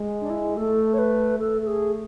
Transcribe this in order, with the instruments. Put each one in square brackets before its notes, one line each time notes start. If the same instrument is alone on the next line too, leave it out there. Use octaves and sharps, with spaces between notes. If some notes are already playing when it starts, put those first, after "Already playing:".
Already playing: [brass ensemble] G#3
[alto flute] D4
E4
[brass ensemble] A3 [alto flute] A4
[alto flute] C#5
B4
[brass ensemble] A3 [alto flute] A4
[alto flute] A4
G#4